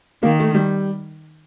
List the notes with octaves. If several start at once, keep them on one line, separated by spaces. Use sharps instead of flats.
D#3 A#3
A3
G3